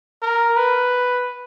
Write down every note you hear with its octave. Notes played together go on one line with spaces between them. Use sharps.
A#4
B4